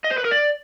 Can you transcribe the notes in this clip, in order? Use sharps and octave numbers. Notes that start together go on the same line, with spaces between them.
D#5
C5
B4
A#4
D5